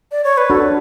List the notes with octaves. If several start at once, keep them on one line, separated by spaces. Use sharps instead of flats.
D5
C#5
B4
D4 F#4 A4